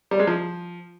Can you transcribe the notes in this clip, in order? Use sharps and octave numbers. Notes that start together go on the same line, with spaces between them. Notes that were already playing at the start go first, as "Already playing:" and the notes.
G3
G#3
F3